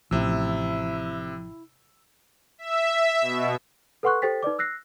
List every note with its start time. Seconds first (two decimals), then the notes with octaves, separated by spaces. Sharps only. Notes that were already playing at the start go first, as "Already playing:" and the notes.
0.11 A1 C3 F3 E4 E6
2.58 E5
3.21 B2
4.03 A4 B4 F#5 C6 C#6 F#6
4.22 G4 A4 C5 G5 A6 B6
4.43 D#4 B4 D5 D6
4.59 E6 F#6 A#6 C7